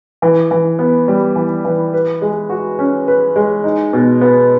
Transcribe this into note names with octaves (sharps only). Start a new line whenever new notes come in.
E3
E3
B3
G3
E3
E3
B4
G#3
F#4
C#4
B4
G#3
D#4
B2
B3